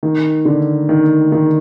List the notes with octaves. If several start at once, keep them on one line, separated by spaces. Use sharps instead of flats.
D#3
D3
D#3
D#3